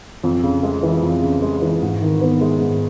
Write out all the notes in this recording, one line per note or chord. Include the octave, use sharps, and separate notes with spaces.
F2
C#3
G#3
E3
F2
C#3
G#3
E3
G#2
D#3
B3
G#3
G#2